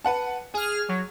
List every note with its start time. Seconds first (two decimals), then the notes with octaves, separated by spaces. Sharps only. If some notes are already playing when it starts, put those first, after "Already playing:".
0.05 B4 F#5 A5
0.54 G#4 G#5 F6
0.89 F#3